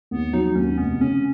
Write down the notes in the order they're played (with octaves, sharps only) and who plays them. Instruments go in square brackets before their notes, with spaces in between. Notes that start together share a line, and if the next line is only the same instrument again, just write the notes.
[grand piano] D#2 [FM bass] B3
[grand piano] F#3 [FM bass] D#4
[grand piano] D#2 [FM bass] C#4
[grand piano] F1 [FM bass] B3
[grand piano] C#3 [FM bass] C#4